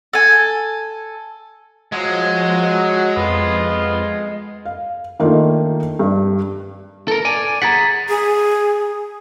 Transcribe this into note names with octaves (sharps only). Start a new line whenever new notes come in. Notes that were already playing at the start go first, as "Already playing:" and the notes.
A4 G#5
F3 F#3 G#3
F2 B3 F4
F5
D#3 A3 A#3 D4 D#4 F4
G2
A4 A#4
D5 G#5
G#4 F#5 A#5 A6 B6
G#4